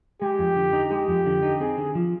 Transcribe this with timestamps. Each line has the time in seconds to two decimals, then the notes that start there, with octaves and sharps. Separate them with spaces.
0.22 G#3 G4
0.39 F2
0.56 D3
0.73 D#4
0.91 G#3 G4
1.08 F2
1.26 D3
1.43 D#4
1.60 C4 G#4
1.78 D3
1.95 F3